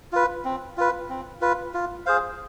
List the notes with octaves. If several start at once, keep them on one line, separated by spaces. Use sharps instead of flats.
F4 B4
C4
F4 B4
C4
F4 B4
F4
G#4 C5 F5